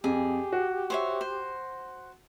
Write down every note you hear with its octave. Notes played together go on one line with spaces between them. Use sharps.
F2 G4 G#4
F#4
C5 C#5 E5
C5